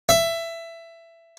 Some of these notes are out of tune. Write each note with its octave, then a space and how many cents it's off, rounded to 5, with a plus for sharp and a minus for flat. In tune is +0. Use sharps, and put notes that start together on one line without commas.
E5 +15